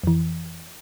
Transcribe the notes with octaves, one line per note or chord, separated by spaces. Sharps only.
F2 E3